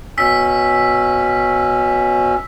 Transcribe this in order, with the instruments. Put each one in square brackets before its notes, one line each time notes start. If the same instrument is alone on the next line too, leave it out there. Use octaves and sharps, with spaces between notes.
[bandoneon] B2 C#4 [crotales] E6 B6